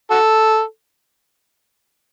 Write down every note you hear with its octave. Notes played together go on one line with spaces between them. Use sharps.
F#4 A4